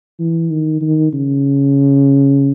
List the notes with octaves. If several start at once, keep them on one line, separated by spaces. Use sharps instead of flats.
E3
D#3
D#3
C#3